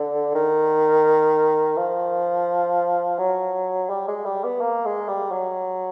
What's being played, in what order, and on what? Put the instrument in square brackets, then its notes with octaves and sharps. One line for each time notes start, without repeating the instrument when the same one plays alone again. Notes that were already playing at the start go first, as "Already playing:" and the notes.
Already playing: [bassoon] D3
D#3
F3
F#3
G3
G#3
G3
B3
A#3
G#3
G3
F#3